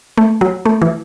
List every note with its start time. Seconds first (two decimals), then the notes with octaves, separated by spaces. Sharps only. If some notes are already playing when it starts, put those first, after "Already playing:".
0.18 A3
0.41 F#3
0.65 A3
0.82 E3